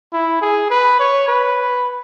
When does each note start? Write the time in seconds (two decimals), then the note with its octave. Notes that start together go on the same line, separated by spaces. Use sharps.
0.13 E4
0.42 G#4
0.70 B4
0.99 C#5
1.28 B4